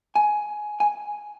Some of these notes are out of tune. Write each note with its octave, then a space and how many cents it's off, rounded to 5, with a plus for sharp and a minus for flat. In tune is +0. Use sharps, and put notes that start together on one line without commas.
G#5 +15
G#5 +5